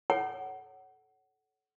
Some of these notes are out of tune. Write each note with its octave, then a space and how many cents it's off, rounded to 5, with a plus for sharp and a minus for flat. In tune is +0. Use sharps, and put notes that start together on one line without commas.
A4 -25 C#5 +0 F#5 +15